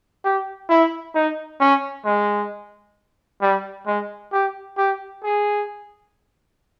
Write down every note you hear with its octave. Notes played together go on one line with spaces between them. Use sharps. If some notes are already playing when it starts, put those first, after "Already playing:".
G4
E4
D#4
C#4
G#3
G3
G#3
G4
G4
G#4